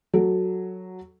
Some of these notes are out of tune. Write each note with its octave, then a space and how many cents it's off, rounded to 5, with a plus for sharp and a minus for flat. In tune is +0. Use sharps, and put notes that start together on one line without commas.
F#3 +0 A4 +0